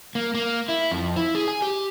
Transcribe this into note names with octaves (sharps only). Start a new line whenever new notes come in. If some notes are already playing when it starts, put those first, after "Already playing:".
A#3
A#3
E4
F2
E4
G#4
G#5
G4